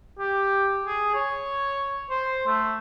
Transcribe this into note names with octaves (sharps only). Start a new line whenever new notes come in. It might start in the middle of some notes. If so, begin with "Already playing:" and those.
G4
G#4
C#5
C5
A3